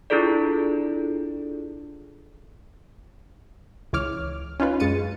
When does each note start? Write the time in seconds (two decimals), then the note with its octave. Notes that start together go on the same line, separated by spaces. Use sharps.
0.10 D4 E4 F4 G#4 A4 D5
3.93 C#2 E3 C#5 D6 F6
4.60 C#4 D#4 F4 B4
4.80 F#2 G#3 A6 C#7 D#7